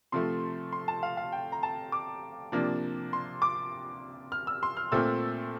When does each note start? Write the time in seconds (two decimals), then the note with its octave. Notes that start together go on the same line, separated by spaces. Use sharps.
0.12 C3 F3 A3 C6
0.73 C6
0.88 A5
1.03 F5
1.17 F5
1.32 G5
1.52 A#5
1.63 A5
1.92 D6
2.52 C3 F3 A#3 D4
3.13 C6
3.42 D6
4.32 F6
4.47 E6
4.63 C6
4.77 F6
4.92 A#2 A3 C4 E6